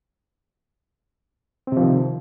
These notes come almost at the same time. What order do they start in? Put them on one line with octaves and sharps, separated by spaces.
C4 C3 F3 D#3